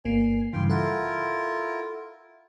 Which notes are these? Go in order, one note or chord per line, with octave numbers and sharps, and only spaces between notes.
G1 A#3 G#5 C7
G2 C#3 E3 F5 G5 C6
E4 F4 A4 A#4 F#5